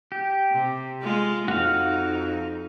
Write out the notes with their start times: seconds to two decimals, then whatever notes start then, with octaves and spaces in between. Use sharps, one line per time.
0.12 G4
0.51 C3
1.02 G#3 F4
1.48 F2 D#4 F#4 F5